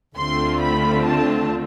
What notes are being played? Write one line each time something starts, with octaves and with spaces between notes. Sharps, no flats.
D2 D3 A3 C4 F4 C6
B5
A5